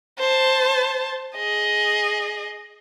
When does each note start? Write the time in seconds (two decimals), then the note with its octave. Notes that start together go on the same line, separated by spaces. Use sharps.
0.19 C5 A5
1.36 G#4 D#5